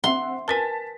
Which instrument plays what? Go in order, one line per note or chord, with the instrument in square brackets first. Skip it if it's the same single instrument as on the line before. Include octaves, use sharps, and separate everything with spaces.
[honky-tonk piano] C4 E5 F#5 [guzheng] C6
[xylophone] A#4 B4 G#5 [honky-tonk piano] A5 A6 B6